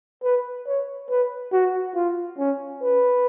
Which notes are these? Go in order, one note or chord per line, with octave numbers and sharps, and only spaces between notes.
B4
C#5
B4
F#4
F4
C#4
B4